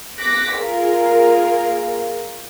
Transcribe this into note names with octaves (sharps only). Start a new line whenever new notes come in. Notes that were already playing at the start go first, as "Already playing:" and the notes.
D6 F#6 A#6 B6
A#3 F4 G#4 A#4